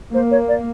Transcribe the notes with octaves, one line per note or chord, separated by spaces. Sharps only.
A#3 C5
C#5
D5